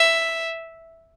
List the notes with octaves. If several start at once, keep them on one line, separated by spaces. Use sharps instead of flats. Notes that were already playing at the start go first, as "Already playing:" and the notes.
Already playing: E5